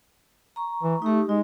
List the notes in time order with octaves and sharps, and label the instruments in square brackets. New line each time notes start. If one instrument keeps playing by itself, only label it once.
[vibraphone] A#5 C#6
[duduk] E3
[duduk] A3 [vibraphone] D#4 G4
[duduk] G#3 [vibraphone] D#4